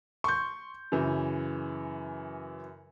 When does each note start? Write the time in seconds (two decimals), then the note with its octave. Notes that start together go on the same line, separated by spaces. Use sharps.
0.24 C6 C#6 G6
0.92 F#2 C#3 E3